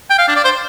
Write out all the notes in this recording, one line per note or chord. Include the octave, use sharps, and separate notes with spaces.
G5
F5
D4
D5
C5